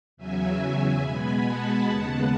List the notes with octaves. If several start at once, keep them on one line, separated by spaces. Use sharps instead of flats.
E2 C#3 F#3 E5 G#5
B2 G#3 B3 G#5 B5
F#5 A5
D#2 C#3 G#3 B3